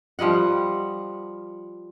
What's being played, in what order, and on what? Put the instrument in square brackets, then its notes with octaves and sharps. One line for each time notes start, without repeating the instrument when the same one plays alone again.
[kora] F3 G3 D#5 F#5